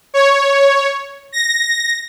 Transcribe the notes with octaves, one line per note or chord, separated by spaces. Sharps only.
C#5
A#6